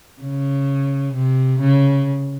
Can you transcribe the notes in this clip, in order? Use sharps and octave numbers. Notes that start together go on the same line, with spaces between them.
C#3
C3
C#3